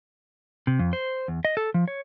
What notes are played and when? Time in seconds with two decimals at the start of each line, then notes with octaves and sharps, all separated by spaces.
0.67 C3
0.79 F2
0.93 C5
1.28 E2
1.45 D#5
1.57 A4
1.74 F3
1.88 C#5